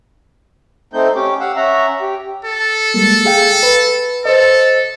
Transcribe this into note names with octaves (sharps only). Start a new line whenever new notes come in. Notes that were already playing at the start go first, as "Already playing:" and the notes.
A3 C4 D#4 G6
C#4 G4 D6
F5 F#5 E6
C#4 E5 F#5 A#5
G4
A4
G3 G#3 A#3
G#4 F5 G5
B4
A4 C5 D#5